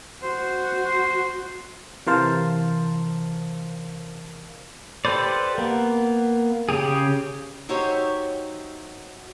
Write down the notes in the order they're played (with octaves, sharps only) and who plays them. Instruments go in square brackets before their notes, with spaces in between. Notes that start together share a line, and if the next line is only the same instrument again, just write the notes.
[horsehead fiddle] F#4 [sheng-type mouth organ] C5
[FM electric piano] C3 E3 A#4 C5 F5 A5
[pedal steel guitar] G4 A4 B4 C5 D5
A#3 B3
C#3 G4 G#4
[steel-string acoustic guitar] F#3 D#4 G4 C5 C#5 E5